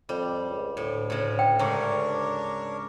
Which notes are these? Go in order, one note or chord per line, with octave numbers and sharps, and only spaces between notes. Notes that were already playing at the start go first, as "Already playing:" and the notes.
F2 G3
C#2
D2 A2
A2 C#3
G5
G#2 C#3 D4 A#4 C#5